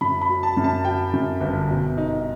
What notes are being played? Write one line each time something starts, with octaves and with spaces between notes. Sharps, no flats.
F#2 B5
B5
F#3
A5
F#2
A5
F#3 G5
F#2
G1
B2
D#4